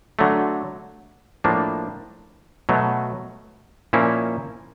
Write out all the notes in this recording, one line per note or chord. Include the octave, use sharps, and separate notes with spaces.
D3 F#3 A3
A2 F3 A#3 D4
B2 F#3 A3
A#2 F3 A#3 C#4 E4